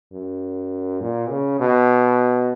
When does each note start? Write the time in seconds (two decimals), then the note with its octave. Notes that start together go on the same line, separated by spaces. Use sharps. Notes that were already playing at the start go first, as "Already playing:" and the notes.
0.12 F#2
1.01 A#2
1.30 C#3
1.60 B2